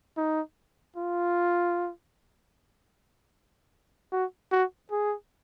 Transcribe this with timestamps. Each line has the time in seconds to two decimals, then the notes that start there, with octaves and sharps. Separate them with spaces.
0.17 D#4
0.96 F4
4.12 F#4
4.52 F#4
4.91 G#4